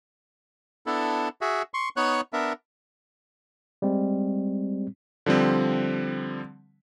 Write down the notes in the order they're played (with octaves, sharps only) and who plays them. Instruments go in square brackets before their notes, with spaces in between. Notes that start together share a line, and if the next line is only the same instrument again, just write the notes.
[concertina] B3 D4 E4 A4
F#4 G#4 E5
C6 C#6
B3 D#4 C#5 C#6 F#6
B3 D4 A#4 E5
[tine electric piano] G3 G#3 C4
[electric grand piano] D3 F3 G3 C4